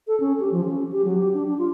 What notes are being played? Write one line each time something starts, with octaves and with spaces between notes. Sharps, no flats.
A4
C#4
G4
F3
C#4
G4
F#3
G4
D4
D4
F4